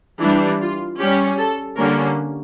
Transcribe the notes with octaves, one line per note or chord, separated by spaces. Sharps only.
E3 G3 D4 E4
F4
G3 C#4 G4
A4
D3 G3 A#3 C#4 A#4